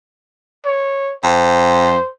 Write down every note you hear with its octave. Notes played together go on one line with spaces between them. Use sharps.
C#5
F2 C5